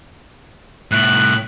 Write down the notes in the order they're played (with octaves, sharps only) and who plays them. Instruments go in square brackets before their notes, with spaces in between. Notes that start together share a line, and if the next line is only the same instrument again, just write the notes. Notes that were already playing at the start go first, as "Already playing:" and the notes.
[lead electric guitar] C2 A2 [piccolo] F#6